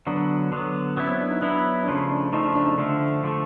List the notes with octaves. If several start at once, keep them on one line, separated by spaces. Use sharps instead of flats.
D3 F#3 B3 D4
D3 F#3 B3
F#3 B3 C#4 E4
C4
D4
D#4
F#3 B3 D4 E4
D4
C#3 F3 A3 C#4
D4
C#3 F3 A3 D#4
D4
D4
D#4
D3 F3 A3 D4
D3 F3 A3